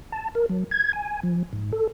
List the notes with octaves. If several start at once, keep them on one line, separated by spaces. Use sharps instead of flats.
A5
A#4
F#3
G#6
G#5
F3
G#2
A4